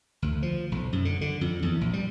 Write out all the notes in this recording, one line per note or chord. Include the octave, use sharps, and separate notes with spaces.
D2
F3
B1
F#2
D3
D3
F2
E2
A#1
G3